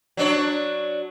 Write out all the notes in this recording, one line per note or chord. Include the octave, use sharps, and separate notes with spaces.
F#3 D4 C#5